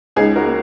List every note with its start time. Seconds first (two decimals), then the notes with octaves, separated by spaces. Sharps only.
0.16 C#2 D#4 G#4
0.35 F#4 A#4
0.45 A#3